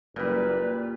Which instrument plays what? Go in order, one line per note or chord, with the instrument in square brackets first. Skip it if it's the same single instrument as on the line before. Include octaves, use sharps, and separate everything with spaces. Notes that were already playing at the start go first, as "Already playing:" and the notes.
[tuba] F#1 [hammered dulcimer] A#2 G3 [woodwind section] B4